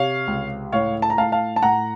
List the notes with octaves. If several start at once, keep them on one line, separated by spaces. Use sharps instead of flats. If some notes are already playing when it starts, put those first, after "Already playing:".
Already playing: C3 C#5 F5
C#2
A2 C#5 F5
A5
A#5
A2 F5 A5
F5 A5
A5
A2 F#5 A#5